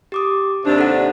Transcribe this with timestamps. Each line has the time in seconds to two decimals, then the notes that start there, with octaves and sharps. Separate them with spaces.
0.12 G4 D6 D#6
0.65 D#2 C3 D4 G4
0.78 A4 F#5